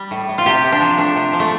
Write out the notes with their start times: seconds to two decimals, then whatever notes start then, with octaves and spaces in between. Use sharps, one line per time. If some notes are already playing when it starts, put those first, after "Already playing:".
Already playing: G3
0.11 A2
0.29 A2
0.38 F4
0.46 C3 G4
0.64 C3
0.72 D4
0.81 F3
0.98 A3 D4
1.16 C3
1.33 F3
1.40 A3